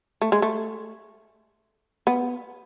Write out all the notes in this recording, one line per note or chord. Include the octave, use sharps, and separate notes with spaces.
A3
G#3
A3
B3